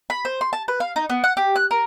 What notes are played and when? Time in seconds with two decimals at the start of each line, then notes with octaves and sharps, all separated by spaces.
0.10 B5
0.25 C5
0.41 C6
0.53 A5
0.68 B4
0.80 F5
0.96 D#4
1.10 B3
1.24 F#5
1.37 G4
1.56 F#6
1.71 A#4